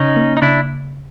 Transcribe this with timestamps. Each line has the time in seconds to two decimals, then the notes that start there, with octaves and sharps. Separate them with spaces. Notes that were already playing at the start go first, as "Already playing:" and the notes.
Already playing: C#3 C#4 D#4
0.16 A#3
0.37 D#4
0.42 C#3 D4 E4